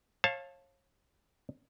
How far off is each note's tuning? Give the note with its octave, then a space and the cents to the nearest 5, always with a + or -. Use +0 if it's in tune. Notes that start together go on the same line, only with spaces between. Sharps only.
C#5 -35 F5 +0 A5 +0